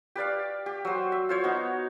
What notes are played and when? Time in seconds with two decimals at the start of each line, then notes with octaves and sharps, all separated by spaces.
0.16 G4 B4 D5 F5
0.66 G4
0.85 F#3 C5
1.12 E5
1.29 F4 C5 C#5
1.44 B3 D#4 F#4